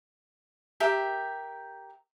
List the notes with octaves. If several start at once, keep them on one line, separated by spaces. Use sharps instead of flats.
G4 A#4 E5